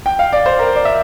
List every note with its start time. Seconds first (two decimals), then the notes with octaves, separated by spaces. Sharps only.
0.06 G5
0.19 F5
0.33 D5
0.46 C5
0.59 A#4
0.76 D5
0.85 E5